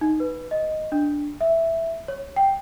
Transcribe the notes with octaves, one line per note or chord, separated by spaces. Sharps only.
D#4
B4
D#5
D4
E5
C#5
G5